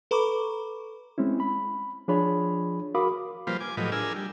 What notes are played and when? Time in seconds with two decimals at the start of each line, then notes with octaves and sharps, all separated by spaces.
0.11 A4 B4 A#5 B5 C#6 D6
1.18 G#3 C4 C#4 E4
1.40 B5
2.08 F3 D4 F4 G#4 C#5 B5
2.95 F#4 A#4 F5 B5 D6 D#6
3.47 F3 G3 A#3 F4 B4 C5
3.60 G#5 D6
3.77 A2 F3 F#3 G4 B4 D#5
3.92 D4 F4 G#4 A#4 G#5 E6
4.16 G3